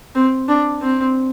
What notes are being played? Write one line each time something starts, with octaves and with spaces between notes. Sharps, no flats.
C4
D4
C4